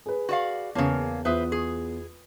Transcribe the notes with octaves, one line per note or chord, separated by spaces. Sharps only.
G#4 B4
F#4 D5 F5
E2 C#3 A#3 C#5 A5
E2 F4 B4 C5 E5 D#6
G#4